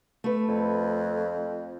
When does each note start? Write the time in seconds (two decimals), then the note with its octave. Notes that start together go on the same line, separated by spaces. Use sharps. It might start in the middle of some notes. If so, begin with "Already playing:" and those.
0.24 A3 B4
0.48 F2